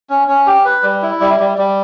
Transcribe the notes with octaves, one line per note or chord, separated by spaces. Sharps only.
C#4
C#4
G4
B4
G3
E4
G3
G3
G3